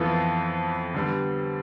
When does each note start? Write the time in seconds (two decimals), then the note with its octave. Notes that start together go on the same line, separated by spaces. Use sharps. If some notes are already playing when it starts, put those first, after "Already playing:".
Already playing: F2 E3 B3 F4 A4
0.94 D3 G3 B3